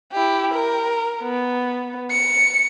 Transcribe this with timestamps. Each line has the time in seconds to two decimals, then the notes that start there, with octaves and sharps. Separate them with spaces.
0.12 E4 G4
0.54 A#4
1.22 B3
2.11 C#7